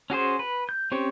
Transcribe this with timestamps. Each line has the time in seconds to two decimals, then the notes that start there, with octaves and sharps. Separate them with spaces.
0.10 C#4 F#4 G#4 C5
0.39 B4
0.69 G6
0.92 C4 C#4 G4 C5 C#5